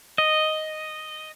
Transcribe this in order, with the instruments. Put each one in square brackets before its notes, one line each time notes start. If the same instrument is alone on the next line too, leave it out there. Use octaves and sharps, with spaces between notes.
[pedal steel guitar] D#5